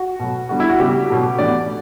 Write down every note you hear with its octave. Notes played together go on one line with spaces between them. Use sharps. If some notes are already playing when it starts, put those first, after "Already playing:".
Already playing: F#4
B2 F#3 A3
D3 G3 B3 F#4
E4
F#4
C#3 G3 B3 G4
B2 F#3 A3
A2 E3 B3 D5